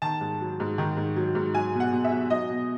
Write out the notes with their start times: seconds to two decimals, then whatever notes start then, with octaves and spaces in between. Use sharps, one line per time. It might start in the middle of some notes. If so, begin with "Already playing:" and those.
0.02 D#3 A5
0.21 G#2
0.41 F#3
0.60 G#2
0.78 D#3
0.97 G#2
1.16 F#3
1.35 G#2
1.55 F#3 G#5
1.74 B2
1.80 F#5
1.92 B2
2.04 E5
2.11 F#3
2.30 F#3 D#5
2.50 B2